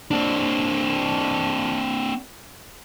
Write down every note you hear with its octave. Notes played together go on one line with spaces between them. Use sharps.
C4 D4